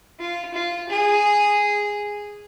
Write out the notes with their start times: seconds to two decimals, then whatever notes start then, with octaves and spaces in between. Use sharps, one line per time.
0.20 F4
0.54 F4
0.90 G#4